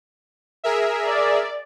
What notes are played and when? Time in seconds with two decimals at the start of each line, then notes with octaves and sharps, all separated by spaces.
0.64 G#4 A#4 E5
1.06 D5